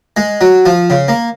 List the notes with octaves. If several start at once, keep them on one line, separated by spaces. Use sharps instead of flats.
G#3
F#3
F3
C#3
A#3